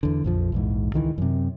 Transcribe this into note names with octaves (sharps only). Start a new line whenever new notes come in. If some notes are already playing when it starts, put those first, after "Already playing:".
E2 D3
A#1 F2 F3
A#1 E2 G#2
C#2 D#3 E3
F#2 C3